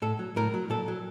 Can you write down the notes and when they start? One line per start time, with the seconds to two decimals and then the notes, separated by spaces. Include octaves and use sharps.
0.02 A2 A4
0.19 F#3
0.36 A2 A#4
0.54 F#3
0.70 A#2 A4
0.88 F#3